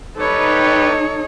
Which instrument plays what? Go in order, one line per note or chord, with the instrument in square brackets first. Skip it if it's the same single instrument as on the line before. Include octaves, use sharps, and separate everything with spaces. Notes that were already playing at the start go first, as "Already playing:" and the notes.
[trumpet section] G3 G4 B4 [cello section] D#4 [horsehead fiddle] A4 C#5